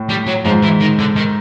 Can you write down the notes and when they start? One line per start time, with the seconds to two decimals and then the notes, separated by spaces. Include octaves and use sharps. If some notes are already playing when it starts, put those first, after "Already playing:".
Already playing: A2
0.09 G3
0.27 F#3
0.45 G#2 F3
0.63 E3
0.81 D#3
0.99 D3
1.16 D#3